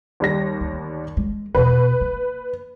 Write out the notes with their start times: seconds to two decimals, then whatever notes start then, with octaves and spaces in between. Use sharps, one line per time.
0.20 D#2 G3 A#6
0.61 D2
1.17 G#3
1.55 E2 B2 B4
2.01 A#3